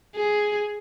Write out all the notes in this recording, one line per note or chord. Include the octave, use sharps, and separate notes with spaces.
G#4